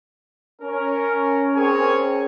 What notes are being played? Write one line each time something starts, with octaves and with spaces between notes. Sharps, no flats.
C#4 A#4
C4 C#4 G#4 A#4 C#5 G#5